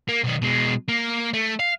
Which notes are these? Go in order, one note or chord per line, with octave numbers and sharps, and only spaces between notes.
A#3
B1 D#3
B2 G#3
A#3
A3
F5